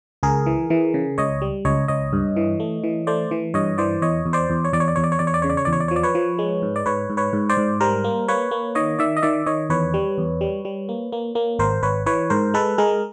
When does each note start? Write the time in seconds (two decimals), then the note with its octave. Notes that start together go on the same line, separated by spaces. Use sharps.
0.23 C#2 G#4 A#4
0.46 E3
0.70 E3
0.94 C#3
1.18 C#2 C#5 D#5
1.42 G3
1.65 C#2 C#5 D#5
1.88 C#2 C#5 D#5
2.13 G2
2.36 E3
2.60 A3
2.84 E3
3.07 A3 C5 D5
3.31 E3
3.54 G2 C#5 D#5
3.78 E3 C5 D5
4.02 E2 C#5 D#5
4.26 E2
4.33 C5 D5
4.50 E2
4.64 C#5
4.73 E2 D5
4.80 C#5
4.88 D5
4.96 E2 C#5
5.04 D5
5.12 C#5
5.19 E2 D5
5.27 C#5
5.34 D5
5.42 C#3 C#5
5.50 D5
5.57 C#5
5.65 E2 D5
5.73 C#5
5.80 D5
5.88 C#5
5.91 F3
5.96 D5
6.03 B4 C#5
6.15 F3
6.39 G#3
6.62 G#2
6.76 D5
6.86 G#2 B4 C#5
7.10 G#2
7.17 B4 C#5
7.33 G#2
7.49 C5 D5
7.57 G#2
7.81 G3 A#4 C5
8.04 A#3
8.28 A#3 B4 C#5
8.51 A#3
8.75 D#3 C#5 D#5
8.99 D#3 D5 E5
9.17 D#5
9.22 D#3 D5 E5
9.46 D#3 C#5 D#5
9.70 E2 B4 C#5
9.94 G3
10.18 E2
10.41 G3
10.65 G3
10.89 A#3
11.12 A#3
11.35 A#3
11.59 G#1 A#4 C5
11.83 G#1 B4 C#5
12.06 E3 B4 C#5
12.30 G#2 A#4 C5
12.54 G#3 A4 B4
12.78 G#3 G#4 A#4